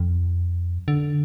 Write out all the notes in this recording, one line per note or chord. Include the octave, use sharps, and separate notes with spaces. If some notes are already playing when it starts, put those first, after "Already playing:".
Already playing: F2
D3